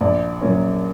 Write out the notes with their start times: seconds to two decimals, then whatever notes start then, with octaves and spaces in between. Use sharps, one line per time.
0.01 A#1 D5
0.41 A#2 F#3 A#3 C#4